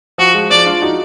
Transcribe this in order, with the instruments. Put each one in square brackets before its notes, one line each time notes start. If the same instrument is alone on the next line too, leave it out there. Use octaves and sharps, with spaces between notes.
[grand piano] F3 [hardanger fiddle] F#4
[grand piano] F3 G#3
[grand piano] F3 G#3 [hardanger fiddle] D5
[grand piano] D4 F4
D#4 F#4